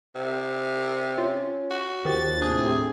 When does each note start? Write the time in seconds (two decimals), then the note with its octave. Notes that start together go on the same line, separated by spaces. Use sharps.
0.15 C3
1.18 C#4 F4
1.71 F#4
2.05 D#2 D#3 F3 G4 A6
2.42 A2 C3 D4 G#4